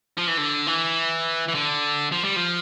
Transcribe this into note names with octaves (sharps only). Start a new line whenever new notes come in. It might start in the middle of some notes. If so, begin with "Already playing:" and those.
F3
E3
D3
E3
E3
D3
F3
G3
F3